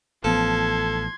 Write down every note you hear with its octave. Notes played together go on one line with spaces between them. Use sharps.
A1 F3 B3 A4 C6 G#6